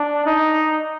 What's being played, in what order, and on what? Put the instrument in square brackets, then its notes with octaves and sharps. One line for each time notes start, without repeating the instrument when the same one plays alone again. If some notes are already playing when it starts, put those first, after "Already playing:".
Already playing: [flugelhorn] D4
D#4